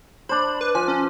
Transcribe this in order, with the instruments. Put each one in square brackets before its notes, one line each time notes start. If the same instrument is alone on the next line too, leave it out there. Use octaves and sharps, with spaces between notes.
[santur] D4 C5 [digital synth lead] B5
[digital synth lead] B4
[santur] F3 [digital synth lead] G#5
[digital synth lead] C#4